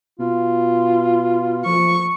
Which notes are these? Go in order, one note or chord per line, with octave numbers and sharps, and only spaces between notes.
B2 F4
F3 C#6